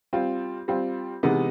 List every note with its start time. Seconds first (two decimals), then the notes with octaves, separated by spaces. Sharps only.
0.13 G3 C4 F4
0.68 G3 C4 F4
1.23 C3 E3 G#3 B3 D#4